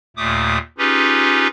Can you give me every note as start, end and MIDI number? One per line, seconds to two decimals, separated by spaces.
0.17 0.58 39
0.17 0.58 46
0.17 0.58 57
0.17 0.58 86
0.17 0.58 87
0.78 1.47 61
0.78 1.47 63
0.78 1.47 65
0.78 1.47 67
0.78 1.47 68
0.78 1.47 71